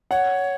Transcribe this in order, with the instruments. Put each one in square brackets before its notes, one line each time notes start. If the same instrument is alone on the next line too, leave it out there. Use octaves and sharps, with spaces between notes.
[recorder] C#5 [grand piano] F#5